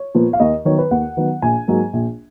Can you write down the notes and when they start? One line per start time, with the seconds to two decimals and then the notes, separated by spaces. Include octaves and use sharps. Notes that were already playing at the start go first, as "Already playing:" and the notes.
Already playing: C#5
0.15 A#2 F3 B3
0.33 F5
0.40 D#2 D#5
0.65 D#3 F#3 B3 C#5
0.78 B4
0.91 D#2 F#5
1.17 D#3 F#3 B3
1.42 A#1 G#5
1.68 G#2 F#3 A#3
1.93 A#1